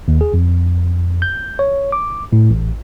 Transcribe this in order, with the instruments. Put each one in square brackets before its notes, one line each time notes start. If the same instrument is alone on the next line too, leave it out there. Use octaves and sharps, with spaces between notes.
[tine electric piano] D#2
G#4
F2
G6
C#5
D6
A2
A1